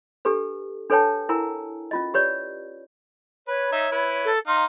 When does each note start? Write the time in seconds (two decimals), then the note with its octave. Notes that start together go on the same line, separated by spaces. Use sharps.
0.25 D4 G4 A4 B4
0.90 D4 A4 B4 C#5 G5 A5
1.29 E4 A#4 F#5 G#5 A#5
1.91 C#4 F4 D#5
2.14 G4 B4 C#5 D5
3.48 B4 C#5
3.72 D#4 E5
3.92 E4 B4
4.24 A4
4.47 D#4 F5 C6